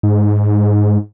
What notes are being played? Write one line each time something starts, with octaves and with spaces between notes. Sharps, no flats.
G#2